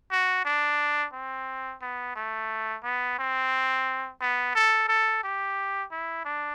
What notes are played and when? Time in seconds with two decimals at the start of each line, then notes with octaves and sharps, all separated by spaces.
0.11 F#4
0.45 D4
1.13 C4
1.82 B3
2.16 A3
2.83 B3
3.19 C4
4.21 B3
4.55 A4
4.88 A4
5.23 G4
5.91 E4
6.25 D4